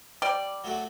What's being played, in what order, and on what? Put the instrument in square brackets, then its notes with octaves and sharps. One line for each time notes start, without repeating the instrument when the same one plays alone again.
[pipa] G3 [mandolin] D5
[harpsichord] F#3 A3 F#4